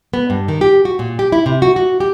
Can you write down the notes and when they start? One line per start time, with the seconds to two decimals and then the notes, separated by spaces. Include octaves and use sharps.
0.14 B3
0.30 G2
0.48 D#3
0.61 G4
0.85 F#4
0.99 A#2
1.19 G4
1.32 E4
1.46 C3
1.62 F#4
1.76 F#4
2.00 G4